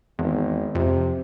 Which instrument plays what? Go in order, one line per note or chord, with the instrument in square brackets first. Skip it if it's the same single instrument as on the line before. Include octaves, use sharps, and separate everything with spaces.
[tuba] G#1 [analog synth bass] E2
[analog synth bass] F2 [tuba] C3